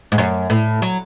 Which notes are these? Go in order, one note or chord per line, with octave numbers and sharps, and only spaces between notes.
G#2
F#2
A2
F#3